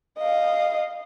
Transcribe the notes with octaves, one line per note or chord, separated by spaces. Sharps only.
D#5 F5